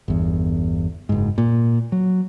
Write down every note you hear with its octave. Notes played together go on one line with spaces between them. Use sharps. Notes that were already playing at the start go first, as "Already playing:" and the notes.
G1 E2
F#1 G#2
A#2
F#3